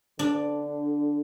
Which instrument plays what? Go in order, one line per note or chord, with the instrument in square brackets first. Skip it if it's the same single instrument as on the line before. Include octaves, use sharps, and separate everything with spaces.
[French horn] D3 [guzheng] D4